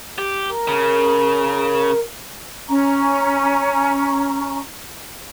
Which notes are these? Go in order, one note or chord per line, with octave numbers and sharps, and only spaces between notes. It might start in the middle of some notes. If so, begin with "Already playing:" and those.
G4
A#4
C#3
C#4 A#5 C#6